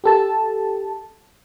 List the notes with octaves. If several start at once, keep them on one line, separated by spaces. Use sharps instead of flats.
G4 A4 A5